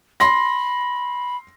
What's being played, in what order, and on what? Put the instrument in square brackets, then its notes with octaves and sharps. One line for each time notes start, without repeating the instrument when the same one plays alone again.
[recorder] B5 [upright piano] C6 A#6